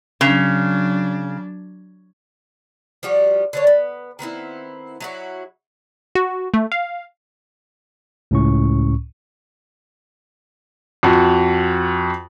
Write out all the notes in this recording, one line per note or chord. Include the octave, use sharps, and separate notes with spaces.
C#3 F#3 D4
F3 G3 F#4 G4
D3 D4 C#5
B3
D#3 B3 C4 E4
F#3 E4 F#4
F#4
A3
F5
C#2 A2 C#4 C#6
F2 F#4